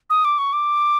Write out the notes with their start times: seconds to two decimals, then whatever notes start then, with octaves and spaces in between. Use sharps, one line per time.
0.10 D#6
0.25 D6
0.38 C#6
0.53 D6